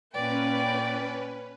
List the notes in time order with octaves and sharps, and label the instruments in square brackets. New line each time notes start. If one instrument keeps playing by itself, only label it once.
[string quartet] A#2 D5 G5 [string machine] C#4 B4